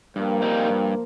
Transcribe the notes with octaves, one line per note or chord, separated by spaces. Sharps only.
G2 F3 A#3
G3 C4 D#4
G2